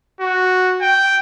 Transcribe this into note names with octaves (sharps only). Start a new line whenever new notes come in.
F#4
G5